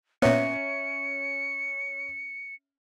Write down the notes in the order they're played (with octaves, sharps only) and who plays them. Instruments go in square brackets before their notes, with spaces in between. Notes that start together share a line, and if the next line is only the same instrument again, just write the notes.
[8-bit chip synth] A#2 B3 [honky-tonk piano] C#4 [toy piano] C#5 E5 A#5 [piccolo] C#7